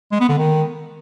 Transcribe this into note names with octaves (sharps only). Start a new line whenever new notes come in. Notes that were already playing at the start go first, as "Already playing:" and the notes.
G#3
B3
D3
D#3